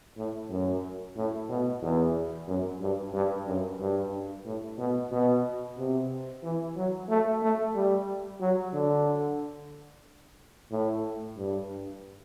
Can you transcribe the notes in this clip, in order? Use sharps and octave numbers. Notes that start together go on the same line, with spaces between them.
A2
F#2
A2
B2
E2
F#2
G2
G2
F#2
G2
A2
B2
B2
C3
E3
F#3
A3
A3
G3
F#3
D3
A2
G2